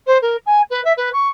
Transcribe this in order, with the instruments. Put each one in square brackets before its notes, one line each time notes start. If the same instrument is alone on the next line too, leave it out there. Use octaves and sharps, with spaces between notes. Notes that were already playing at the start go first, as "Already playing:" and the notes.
[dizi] C5
A#4
G#5
B4
E5
B4
C#6